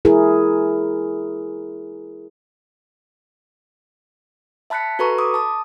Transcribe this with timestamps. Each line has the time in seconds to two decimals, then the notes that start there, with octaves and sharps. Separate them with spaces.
0.05 E4 G#4 A#4
4.70 E5 A5 B5 F#6 B6 C#7
4.99 F#4 A4 B4 A#5 B5 C#6
5.19 B5 D6 D#6
5.34 A5 D#6